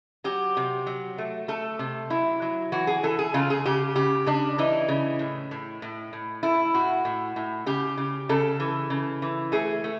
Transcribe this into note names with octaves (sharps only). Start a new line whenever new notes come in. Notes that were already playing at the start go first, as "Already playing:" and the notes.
F#3 G4
C3
F#3
A3
A3 A4
C3
F#3 E4
F#3
E3 F#4
G#4
E3 A4
G#4
C#3 F4
G#4
C#3 G4
C#3 G4
C#3 D4
E3 D#4
C#3
A2
A2
A2
A2
A3 E4
A2 F#4
A2
A2
C#3 G4
C#3
C#3 A4
E3
C#3
E3
A3 G#4
A3